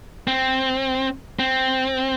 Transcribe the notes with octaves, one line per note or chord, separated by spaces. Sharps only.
C4
C4